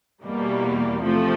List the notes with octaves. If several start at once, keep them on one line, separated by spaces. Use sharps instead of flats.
E2 B2 G3 A#3
C3 F3 A3